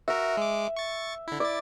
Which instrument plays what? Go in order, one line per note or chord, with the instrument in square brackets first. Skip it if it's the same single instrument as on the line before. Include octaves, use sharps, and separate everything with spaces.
[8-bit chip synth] F#4 A#4 [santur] E5
[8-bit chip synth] G#3 D6
C#6 A6
D3 E4
[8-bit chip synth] E4 A6 [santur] D5